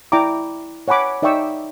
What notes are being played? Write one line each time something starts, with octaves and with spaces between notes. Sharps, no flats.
E4 D5 G5 A#5 D6
C#5 F#5 G#5 B5 D6
D#4 D5 E5 G5 C#6 E6